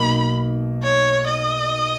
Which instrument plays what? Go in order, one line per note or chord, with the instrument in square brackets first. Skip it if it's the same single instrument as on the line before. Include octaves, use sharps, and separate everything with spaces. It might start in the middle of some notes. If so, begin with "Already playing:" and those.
Already playing: [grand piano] B1 B2 A#3 D#4 [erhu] B5
[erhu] C#5
D#5